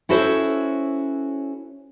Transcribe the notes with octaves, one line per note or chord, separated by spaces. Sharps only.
C#4 E4 F#4 A4 C5 C#5